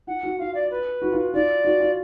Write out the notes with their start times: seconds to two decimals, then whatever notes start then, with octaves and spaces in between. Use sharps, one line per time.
0.07 F4 F#5
0.23 F#4
0.39 F4 F5
0.54 D5
0.70 B4
1.02 F#4
1.12 F4
1.33 F4 D5
1.65 F#4
1.80 F4